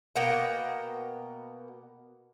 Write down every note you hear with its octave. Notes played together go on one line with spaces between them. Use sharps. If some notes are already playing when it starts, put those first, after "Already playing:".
B2 A#3 F#5 G5